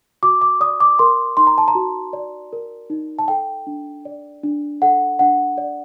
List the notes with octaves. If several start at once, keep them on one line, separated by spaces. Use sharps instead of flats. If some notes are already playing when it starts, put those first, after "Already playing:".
F#4 D6
D6
D5 D#6
D6
A#4 C6
D#4 C6
A#5
A5
A#5
F#4
D5
A#4
D#4
A5
A4 G5
D4
D5
D4
A4 F#5
D4 F#5
D5